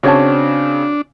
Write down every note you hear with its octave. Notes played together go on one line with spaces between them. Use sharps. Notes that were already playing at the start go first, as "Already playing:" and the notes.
C#3 C4 D4 F#4 C#5 A5